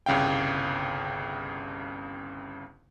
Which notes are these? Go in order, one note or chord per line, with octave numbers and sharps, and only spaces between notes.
G1 C2 C#3 F5 G5